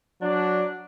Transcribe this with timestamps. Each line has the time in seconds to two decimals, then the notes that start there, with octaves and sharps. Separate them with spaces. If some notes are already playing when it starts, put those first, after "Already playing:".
0.21 F#3 D4